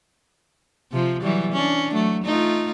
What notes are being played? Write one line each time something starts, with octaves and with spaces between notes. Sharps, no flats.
C3 F3
E3 F#3 G3
C#4 D4
F#3 A3
A3 D#4 F4